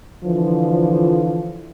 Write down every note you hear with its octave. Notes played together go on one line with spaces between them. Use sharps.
D3 E3 F3